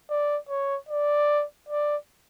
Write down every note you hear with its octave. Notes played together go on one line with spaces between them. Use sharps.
D5
C#5
D5
D5